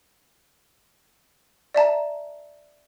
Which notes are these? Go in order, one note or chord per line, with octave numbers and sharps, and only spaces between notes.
D5 E5 A5 A#5